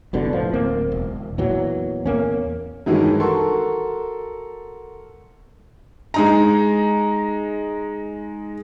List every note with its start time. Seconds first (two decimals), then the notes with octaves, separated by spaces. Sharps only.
0.13 F#1 C2 B2 D3
0.33 A2 F3
0.53 D1 A#3 C4
0.92 E1
1.38 E2 A#2 E3 F#3
2.06 E2 A#3 C#4
2.86 G2 D#3 E3 F#3 G#3
3.20 F#4 A4 A#4 A5 C6 C#6
6.14 G#3 D#4 A#5